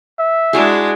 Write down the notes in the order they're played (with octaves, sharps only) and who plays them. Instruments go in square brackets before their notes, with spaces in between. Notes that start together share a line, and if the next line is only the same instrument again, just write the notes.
[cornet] E5
[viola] G#3 D4 [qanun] E4 F#4 G#4